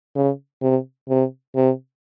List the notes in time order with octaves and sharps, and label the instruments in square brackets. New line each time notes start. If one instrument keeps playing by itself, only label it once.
[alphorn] C#3
C3
C3
C3